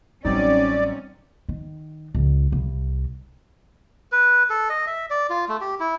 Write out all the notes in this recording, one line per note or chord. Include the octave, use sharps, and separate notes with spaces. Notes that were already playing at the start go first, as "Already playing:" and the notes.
A1 F#3 G3 C4 C#4 D#4 D5
D#3
C#2
C2
B4
A4
D#5
E5
D5
F4
A3
G4
E4